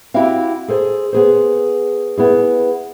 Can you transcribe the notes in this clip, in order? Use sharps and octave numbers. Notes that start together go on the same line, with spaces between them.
C4 E4 F#4 G4 E5 F5
G#4 A4 C5
B3 G#4 C5
B3 E4 G#4